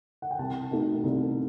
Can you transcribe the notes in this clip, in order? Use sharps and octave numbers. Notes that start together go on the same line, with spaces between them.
F#5
G5
C2 A5
B2 A3 D#4
C2